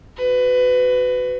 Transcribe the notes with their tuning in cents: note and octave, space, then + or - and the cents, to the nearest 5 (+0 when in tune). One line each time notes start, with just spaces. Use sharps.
F#4 +0 B4 +25